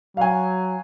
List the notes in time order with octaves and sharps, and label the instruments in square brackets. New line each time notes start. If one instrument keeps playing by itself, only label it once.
[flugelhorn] F#3 [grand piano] F5 G#5